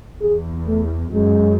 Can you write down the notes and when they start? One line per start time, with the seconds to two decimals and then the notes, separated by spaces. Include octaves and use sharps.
0.21 E2 G#4
0.67 A3
1.14 F#2 G#3